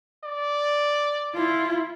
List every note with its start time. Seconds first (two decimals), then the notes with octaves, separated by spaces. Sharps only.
0.24 D5
1.35 E4 F4